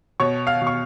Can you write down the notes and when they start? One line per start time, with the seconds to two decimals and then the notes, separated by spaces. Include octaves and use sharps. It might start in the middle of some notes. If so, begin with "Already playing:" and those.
0.20 B2 C#5 C#6
0.47 F5 F6
0.61 B2
0.67 C#6